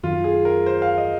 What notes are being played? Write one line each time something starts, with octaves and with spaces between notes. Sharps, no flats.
F#2 D#3 F#3 F4
G#4
A#4
C5
F5
D#5